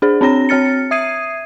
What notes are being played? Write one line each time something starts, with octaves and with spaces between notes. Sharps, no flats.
D4 G#4 C5
C4 D4 C#5 A#5 A#6
C4 C#5 F6 A6 C#7
E5 D#6 G#6 C7 D#7